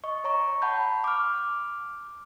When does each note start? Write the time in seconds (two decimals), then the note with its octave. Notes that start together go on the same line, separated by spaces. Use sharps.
0.04 D#5 C#6
0.24 C#5 A#5 C#6
0.62 F#5 A5 B5 G6
1.04 D6 F6